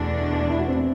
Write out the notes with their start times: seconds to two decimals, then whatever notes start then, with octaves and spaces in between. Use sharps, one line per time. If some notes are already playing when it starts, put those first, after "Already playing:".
Already playing: E2 B2 A3 D4
0.50 E4
0.59 F#4
0.68 C4 E4